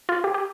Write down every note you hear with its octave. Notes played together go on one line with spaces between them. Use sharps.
F4
G4
G4